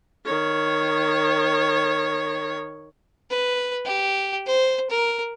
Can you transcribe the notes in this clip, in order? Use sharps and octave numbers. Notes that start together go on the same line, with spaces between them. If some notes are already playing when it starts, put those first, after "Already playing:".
D#3 C#5
B4
G4
C5
A#4